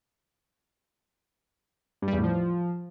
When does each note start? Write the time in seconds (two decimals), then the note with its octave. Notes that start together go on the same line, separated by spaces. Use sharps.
2.02 G2
2.08 G3
2.13 E2
2.18 A2
2.24 F3